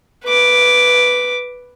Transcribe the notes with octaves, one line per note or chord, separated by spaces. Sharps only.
B4 D6